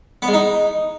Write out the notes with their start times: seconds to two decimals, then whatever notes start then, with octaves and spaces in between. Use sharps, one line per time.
0.22 B3
0.28 G#3
0.33 D#4